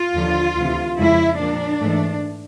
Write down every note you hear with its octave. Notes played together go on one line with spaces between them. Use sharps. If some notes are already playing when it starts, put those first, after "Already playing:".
Already playing: F4
D#2 D3 F3
D2 C3 E3
F2 C#3 F3 G#3 E4
A#2 F3 A#3 D4
G#2 E3 A3